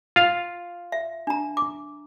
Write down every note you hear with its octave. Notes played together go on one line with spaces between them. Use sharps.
F4 F5
E5
D4 A#5
D6